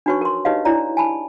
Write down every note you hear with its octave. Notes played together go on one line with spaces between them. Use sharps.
D4 D#4 F#4 B4 C#5 C#6
A#4 C6
D#4 G4 B4 C#5 D#5 F5
D4 E4 C#5 D5 A#5
G#5 A5 B5